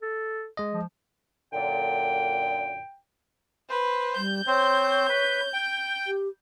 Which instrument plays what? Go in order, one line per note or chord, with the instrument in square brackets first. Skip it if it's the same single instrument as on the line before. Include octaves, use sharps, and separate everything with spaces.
[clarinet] A4
[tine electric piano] G#3 D#5
[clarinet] F3
[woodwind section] F#2 A#2 D3 [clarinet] G5
[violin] B4 [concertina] C5
[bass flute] G3 [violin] G6
[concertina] C4 C5 [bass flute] C#5
[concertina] B4
G5
[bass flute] G4